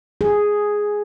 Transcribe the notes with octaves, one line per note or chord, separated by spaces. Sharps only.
G#4